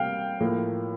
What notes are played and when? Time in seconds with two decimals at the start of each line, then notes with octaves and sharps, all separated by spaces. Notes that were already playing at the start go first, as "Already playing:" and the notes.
Already playing: C3 G3 A#3 F5 G5
0.40 A2 F3 A#3